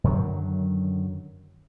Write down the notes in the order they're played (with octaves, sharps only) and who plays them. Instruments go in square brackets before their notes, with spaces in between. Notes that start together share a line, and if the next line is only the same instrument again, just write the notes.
[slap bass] F#2 D3 D#3 F#3